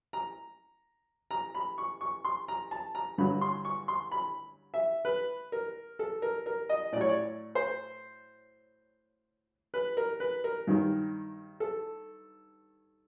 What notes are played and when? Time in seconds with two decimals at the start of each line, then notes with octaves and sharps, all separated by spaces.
0.13 A#5
1.31 A#5
1.55 B5
1.78 C#6
2.01 C#6
2.25 C6
2.48 A#5
2.71 A5
2.95 A#5
3.18 G2 D3 F#3 B5
3.41 C6
3.65 C#6
3.88 C6
4.12 B5
4.74 E5
5.05 B4
5.52 A#4
5.99 A4
6.22 A#4
6.46 A#4
6.69 D#5
6.92 A2 D5
6.96 F#3 C#5
7.09 D5
7.55 C5
9.74 B4
9.97 A#4
10.20 B4
10.44 A#4
10.67 G2 D#3 F#3
11.60 A4